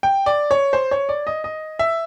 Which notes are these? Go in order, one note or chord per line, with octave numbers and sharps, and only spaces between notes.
G5
D5
C#5
C5
C#5
D5
D#5
D#5
E5